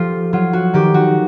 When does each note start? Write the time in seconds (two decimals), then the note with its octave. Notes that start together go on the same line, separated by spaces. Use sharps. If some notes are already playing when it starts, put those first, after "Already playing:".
Already playing: F3 F4 G4 A4
0.33 F#3 F4
0.53 F#4
0.74 D#3 G4
0.94 F#4